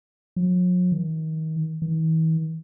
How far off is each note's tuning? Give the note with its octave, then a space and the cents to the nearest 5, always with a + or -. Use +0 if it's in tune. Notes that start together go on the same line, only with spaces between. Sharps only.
F#3 -45
D#3 +30
E3 -45